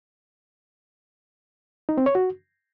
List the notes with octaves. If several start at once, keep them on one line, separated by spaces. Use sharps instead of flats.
D#4
C4
C#5
F#4